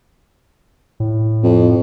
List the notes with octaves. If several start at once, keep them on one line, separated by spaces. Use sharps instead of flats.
A2
F2